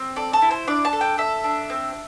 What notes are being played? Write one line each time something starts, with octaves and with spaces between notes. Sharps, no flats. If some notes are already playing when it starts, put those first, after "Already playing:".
Already playing: C4
A4 D5
A4
E4
C5
D4 D5
A5
A4
G5
A4 E5
D4
C4